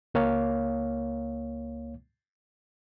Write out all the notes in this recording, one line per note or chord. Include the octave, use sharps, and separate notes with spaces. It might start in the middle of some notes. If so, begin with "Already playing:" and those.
C#2 A#3 C#5 F5